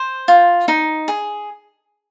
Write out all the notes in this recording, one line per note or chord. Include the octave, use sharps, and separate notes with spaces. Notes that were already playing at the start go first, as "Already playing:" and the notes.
Already playing: C5
F4
D#4
G#4